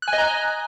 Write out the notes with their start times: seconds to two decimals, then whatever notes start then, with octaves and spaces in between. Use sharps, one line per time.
0.02 F#6
0.08 G#5
0.13 D#5
0.18 A#5